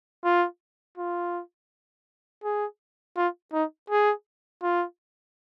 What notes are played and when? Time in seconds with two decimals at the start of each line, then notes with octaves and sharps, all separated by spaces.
0.24 F4
0.98 F4
2.44 G#4
3.17 F4
3.53 D#4
3.90 G#4
4.63 F4